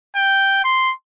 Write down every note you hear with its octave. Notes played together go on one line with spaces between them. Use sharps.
G5
C6